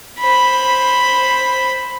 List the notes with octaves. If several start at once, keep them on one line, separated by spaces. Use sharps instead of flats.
C5 B5